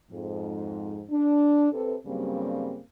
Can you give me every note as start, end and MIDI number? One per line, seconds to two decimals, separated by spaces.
0.11 1.01 41
0.11 1.01 44
1.10 1.69 62
1.73 1.95 48
1.73 1.95 69
1.73 1.95 71
2.06 2.80 43
2.06 2.80 49
2.06 2.80 54
2.06 2.80 55
2.06 2.80 58
2.06 2.80 60